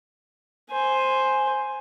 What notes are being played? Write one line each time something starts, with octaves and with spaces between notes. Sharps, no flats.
C5 G#5